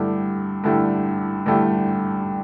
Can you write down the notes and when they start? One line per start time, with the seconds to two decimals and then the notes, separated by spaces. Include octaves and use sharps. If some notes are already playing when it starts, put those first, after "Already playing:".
Already playing: G2 D3 A3 E4 G4
0.64 G2 D3 A3 E4 G4
1.46 G2 D3 A3 E4 G4